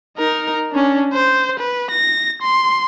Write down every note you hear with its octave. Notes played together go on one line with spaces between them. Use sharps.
D#4 A#4
C#4 D4
C5
B4
A#6
C6